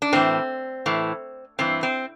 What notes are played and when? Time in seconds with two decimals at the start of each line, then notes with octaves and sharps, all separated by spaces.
0.02 D4
0.12 A2 E3 C4
0.86 A2 E3
1.59 G2 E3 C4
1.83 C4